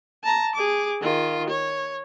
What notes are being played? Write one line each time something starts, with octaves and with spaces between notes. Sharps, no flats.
A5 A#5
G#4 D6
D#3 F4
C#5